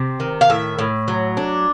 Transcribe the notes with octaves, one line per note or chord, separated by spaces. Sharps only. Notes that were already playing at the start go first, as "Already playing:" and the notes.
Already playing: C3 C4
D#3
F5
A2 E5
A2
F#3
D4